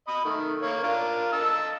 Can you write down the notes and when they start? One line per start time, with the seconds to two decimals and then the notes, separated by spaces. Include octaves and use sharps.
0.08 D#5 B5 D#6
0.25 D#3 A3
0.62 A#3 C#5
0.83 D4 F4 A#4
1.32 D#5 A5 E6